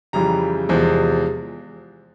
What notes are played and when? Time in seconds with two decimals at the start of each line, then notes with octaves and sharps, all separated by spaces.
0.13 F2 C#3 E3 G3 A#5
0.69 E2 C3 F3 G#3